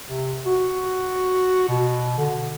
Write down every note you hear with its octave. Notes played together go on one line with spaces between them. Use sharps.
C3
F#4
B2
D3